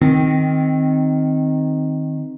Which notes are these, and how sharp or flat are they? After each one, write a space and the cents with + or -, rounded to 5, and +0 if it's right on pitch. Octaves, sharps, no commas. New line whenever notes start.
D#3 +0 C4 +0